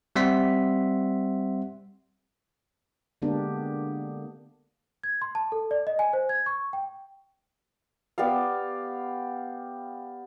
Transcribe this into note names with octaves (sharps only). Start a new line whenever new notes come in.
G3 C4 E5 F#5 C6 B6
D3 G#3 A#3 B3 D4 G4
G#6
C6
A5
A4
D5
D#5
G#5
C5
G#6
C#6
G5
B3 G4 D5 F5